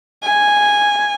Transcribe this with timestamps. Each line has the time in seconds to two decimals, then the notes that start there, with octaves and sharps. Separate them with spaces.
0.24 G#5